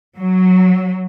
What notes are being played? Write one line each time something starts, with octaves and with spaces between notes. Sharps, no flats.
F#3